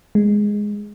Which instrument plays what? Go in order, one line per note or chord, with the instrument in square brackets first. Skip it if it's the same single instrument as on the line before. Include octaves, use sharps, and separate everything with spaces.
[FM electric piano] G#3